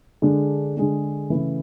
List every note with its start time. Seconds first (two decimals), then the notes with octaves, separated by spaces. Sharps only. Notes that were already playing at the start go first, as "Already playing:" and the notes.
0.22 D3 G#3 D4 G#4
0.77 D3 G#3 D4 G#4
1.30 C#3 E3 A3 E4